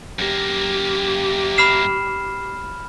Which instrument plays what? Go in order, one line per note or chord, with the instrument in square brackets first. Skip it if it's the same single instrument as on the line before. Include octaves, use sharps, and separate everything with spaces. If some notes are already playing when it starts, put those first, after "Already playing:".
[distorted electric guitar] F#2 A#3 [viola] G4
[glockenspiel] B5 F6 E7 [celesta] C7